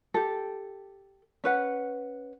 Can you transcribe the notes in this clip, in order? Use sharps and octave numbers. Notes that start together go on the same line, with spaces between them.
G4 A4
C#4 B4 F#5